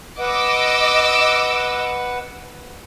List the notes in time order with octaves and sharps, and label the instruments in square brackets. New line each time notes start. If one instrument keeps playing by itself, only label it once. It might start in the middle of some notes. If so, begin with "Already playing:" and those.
[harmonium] B4 F#5 [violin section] D#5 D6 E6